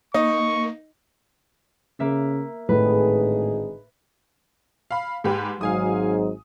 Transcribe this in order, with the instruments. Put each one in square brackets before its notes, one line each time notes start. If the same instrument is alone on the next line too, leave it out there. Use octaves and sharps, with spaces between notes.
[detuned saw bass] A#3 [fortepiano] D#4 [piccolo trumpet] C#6
[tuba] C#3 [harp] A#3 E5 B6
[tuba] G#1 [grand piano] A2 [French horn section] D3 D#4 G#4 [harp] B4
[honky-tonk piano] F5 B5
G#2 G4 B4
[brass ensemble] G#1 G#2 F#3 [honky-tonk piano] F5 G#5 D#6